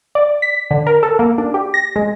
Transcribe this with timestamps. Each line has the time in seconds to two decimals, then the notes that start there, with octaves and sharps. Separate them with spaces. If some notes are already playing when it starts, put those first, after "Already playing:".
0.15 D5
0.42 B6
0.71 D3
0.87 A#4
1.03 A4
1.19 A#3
1.38 D4
1.54 G4
1.74 A#6
1.96 G#3